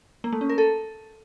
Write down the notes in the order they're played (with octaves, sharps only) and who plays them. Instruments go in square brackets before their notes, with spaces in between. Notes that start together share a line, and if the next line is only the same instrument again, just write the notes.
[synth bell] A#3
A3
C#4
A#4
A4